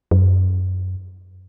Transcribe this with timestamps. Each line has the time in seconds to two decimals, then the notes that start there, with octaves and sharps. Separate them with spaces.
0.11 F#2